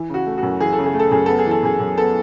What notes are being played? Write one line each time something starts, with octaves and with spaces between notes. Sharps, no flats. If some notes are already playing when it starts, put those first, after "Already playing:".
Already playing: E3
C#3 F#4
A3
F#4
F#2
E3 G#4
A4
C#3
G#4
A3
A4
F#2 G#4
B3 A4
G#4
E3 A4
F#2 G#4
F#2
B3 A4